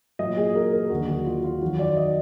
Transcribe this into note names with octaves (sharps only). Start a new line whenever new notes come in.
A#2 F#3 D#5
G#4
A#4
A#4
D#2 D3 F#3 F#4
F#4
F4
F4
F2 D#3 F#3 F#4
D5
D#5